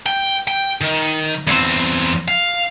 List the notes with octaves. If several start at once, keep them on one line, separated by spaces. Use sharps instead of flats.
G5
G5
D#3
E2 C4
F5